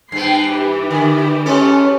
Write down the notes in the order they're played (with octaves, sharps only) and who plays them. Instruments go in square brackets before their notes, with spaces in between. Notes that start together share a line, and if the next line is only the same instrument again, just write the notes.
[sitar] G2 B3 [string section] G5 C7
[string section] E3 G4
[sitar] D3
[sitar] G#3 B3 A4 [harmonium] C#4